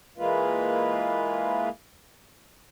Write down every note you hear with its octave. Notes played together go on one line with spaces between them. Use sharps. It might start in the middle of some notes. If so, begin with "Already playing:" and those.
E3 G#3 A#3 F4 B4